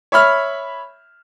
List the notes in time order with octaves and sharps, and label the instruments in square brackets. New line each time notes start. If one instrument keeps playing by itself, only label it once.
[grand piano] C#5 E5 B5 F6